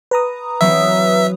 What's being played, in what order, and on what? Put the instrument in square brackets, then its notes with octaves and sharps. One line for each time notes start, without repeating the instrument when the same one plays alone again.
[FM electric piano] B4 A#5 D#6
[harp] E3 F#3 C4 [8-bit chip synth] E5